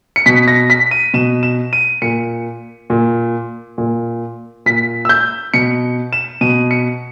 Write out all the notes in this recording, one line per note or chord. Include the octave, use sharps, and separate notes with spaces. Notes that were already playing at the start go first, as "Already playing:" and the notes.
C#7
B2 B6
A#6
B6
D#7
B2 E7
E7
D#7
A#2 C#7
A#2
A#2
A#2 B6
E6
G6
B2 C#7
E7
B2 D#7
C#7